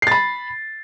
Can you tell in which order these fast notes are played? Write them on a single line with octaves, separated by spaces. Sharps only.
C7 A6 B5